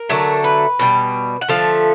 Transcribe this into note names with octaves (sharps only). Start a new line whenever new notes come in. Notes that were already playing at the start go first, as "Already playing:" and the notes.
Already playing: A#4
D3 F#3 A3
B4
B2 G3
F#5
D3 F3 A3 F5